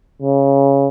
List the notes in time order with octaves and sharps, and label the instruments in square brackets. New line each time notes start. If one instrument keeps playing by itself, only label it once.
[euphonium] C#3